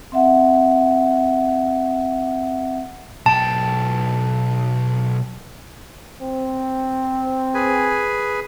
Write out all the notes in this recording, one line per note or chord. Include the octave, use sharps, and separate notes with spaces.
C4 E5 F#5
B1 G5 A5
C4
G#4 B4 G#5